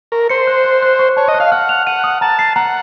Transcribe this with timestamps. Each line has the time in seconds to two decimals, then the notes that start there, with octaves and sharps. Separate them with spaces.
0.12 A#4 C#6
0.30 C5 C#7
0.47 F#6
0.64 F#6
0.82 F#6
0.99 C#6
1.17 C#5 A5
1.28 D#5
1.34 F#6
1.40 F5
1.52 F#5 F6
1.69 F7
1.87 F#5 D#7
2.04 D#6
2.21 A5 A#5
2.39 C7
2.56 F#5 A#5